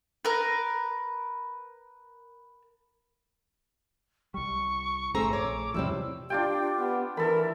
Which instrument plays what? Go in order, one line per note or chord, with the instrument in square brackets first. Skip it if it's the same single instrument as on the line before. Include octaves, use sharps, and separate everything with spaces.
[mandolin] A#4 B4
[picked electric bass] C2 G3 [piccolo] C#6
[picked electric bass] G1 [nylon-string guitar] A3 G#4 [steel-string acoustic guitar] C4 C5 A#5 [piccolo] E6
[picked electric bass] A#1 [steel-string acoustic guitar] C#5 [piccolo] D6
[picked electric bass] E2 E3 F3 [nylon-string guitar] C3 G3 E4 [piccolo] E6
[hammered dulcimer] D4 F4 G5 [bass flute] G4
[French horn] B3
[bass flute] E3 [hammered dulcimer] A4 B5 [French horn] A#4